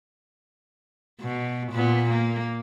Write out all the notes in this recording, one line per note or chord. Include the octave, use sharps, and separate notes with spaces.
B2
A#2 B3
A#3